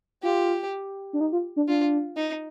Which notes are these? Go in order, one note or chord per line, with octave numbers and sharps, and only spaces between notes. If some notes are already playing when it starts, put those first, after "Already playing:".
F4 G4
D4
D#4
F4
D4
D4 F4
D#4